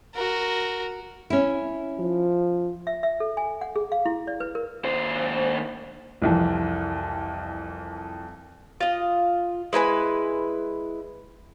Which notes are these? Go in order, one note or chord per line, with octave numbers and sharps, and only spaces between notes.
F#4 A#4
C#4 E4
F3
E5
E5
A4
G#5
F#5
G#4
F5
E4
D5
B4
A#4
D#2 C5
C2 F2 E3
F4 D#5
G#3 E4 B4 G#5